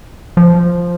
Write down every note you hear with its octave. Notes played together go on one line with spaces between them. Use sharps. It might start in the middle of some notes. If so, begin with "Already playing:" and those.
F3